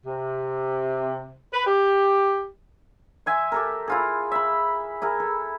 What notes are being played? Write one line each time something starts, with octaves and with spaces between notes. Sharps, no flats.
C3
B4
G4
E5 G#5 C6
G4 A4 A#4
E4 F4 G#4
E5 B5
E4 G#4 A#4
A4